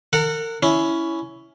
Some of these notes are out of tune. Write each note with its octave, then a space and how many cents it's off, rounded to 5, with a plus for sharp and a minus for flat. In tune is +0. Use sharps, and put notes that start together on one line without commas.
A#4 -40 F#5 -10
C#4 +10 E4 +0